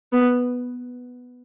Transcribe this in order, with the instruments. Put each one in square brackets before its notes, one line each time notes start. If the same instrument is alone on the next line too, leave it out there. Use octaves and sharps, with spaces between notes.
[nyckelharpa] B3